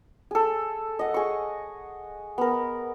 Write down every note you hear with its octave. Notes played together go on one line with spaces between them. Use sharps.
G#4 A4
D#5 F#5
G#4 C#6
B3 A#4